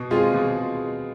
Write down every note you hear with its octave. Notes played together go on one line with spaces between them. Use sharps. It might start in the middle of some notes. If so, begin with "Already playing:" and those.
Already playing: B2
G#3 C4 F4 G#4
B2